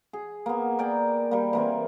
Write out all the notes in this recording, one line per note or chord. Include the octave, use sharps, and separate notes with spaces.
G#4
A#3 B3
A#4 D5 G5 G#5
G3 A#3
E3 A#3 C4